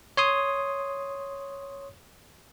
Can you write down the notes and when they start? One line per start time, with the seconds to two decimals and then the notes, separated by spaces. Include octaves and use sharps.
0.17 C#5 C6 D#6